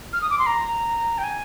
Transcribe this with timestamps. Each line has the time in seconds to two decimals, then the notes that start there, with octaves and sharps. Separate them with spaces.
0.13 F6
0.22 D#6
0.30 D6
0.39 C6
0.46 A#5
1.18 G5
1.24 G#5